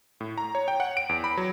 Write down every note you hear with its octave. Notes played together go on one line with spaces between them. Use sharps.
A2
A#5
C#5
G5
F#5
D7
E2
B5
F#3